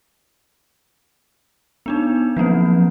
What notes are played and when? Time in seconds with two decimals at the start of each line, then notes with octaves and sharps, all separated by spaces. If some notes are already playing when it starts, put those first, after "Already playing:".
1.86 B3 D4 D#4
2.37 F3 F#3 A#3 C4